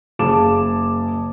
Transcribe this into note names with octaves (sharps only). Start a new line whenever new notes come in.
F#1 G#4 F5 A5 D6 E7